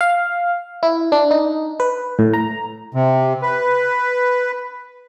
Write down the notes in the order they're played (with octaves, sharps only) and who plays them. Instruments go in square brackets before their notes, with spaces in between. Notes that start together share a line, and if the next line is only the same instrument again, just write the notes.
[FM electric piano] F5
E4
D4
D#4
B4
A2
A#5
[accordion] C3
B4